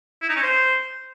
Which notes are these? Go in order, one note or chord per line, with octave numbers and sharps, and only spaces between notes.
E4
D#4
C#4
C5